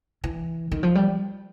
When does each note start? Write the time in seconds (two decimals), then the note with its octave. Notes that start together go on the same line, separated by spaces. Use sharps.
0.24 E3
0.72 D#3
0.83 F3
0.95 G3